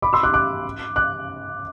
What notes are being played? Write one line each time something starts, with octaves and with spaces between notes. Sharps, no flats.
B5 D6
C6 E6
D6 F#6
D6 F#6
D6 F#6